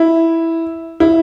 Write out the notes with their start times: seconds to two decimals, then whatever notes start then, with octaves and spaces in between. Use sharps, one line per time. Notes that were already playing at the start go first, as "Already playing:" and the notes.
Already playing: E4
1.00 E4